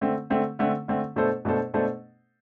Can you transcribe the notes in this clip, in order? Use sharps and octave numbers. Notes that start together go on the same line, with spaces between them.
D3 A3 C4
D3 A3 C4
D3 A3 C4
D3 A3 C4
B2 A3 D4 A4 C5
B2 A3 D4 A4 C5
B2 A3 D4 A4 C5